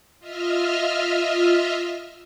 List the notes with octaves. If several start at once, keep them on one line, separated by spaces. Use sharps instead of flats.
F4 D#5 E5 F6